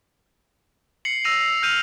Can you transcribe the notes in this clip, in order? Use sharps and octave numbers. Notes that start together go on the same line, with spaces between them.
C7 C#7 F#7
E6 A#6 C7 D#7 F7
F6 G6 D#7 F7